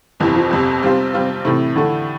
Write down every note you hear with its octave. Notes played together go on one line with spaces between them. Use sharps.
G1 F2 C3 E3
F3
G1 F2 C3
C3 G3 C4 F4 C5
C3 G3 C4 F4 C5
A2 C3 E3 A3 E4
A2 D3 E3 A3 E4